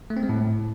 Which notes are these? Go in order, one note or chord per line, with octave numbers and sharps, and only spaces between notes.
A3
C4
G#3
A2